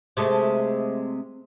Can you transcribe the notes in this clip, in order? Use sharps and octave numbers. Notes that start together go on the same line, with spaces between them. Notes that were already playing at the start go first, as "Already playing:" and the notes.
C3 G#3 A3